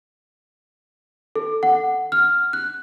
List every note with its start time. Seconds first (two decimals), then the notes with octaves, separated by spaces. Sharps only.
1.35 A4
1.63 F#5
2.12 F6
2.53 F#6